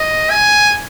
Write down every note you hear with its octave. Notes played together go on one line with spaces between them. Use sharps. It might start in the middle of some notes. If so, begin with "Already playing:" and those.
Already playing: D#5
G#5